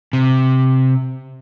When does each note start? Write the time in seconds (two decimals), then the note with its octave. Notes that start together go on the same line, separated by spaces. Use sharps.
0.13 C3